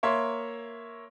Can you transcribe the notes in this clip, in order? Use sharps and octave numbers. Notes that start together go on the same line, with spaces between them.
A#3 C#5 E5 C6